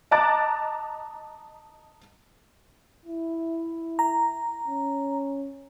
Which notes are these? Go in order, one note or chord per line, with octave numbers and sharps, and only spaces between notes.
D#5 A5 A#5 D6 F#6 A6
E4
A#5
C#4